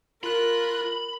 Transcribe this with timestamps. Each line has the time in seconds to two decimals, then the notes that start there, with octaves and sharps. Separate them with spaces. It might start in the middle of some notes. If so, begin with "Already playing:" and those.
0.23 F4 A#4 B5 F#6